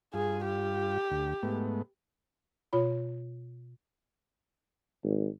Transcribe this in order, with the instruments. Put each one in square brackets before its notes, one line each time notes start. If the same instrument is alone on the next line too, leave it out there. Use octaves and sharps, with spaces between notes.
[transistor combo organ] G2 F4 [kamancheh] G#4
[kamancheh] G4
[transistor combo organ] D2
G#2 A3 B3
[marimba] B2 F4 C#5 B5
[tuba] G#1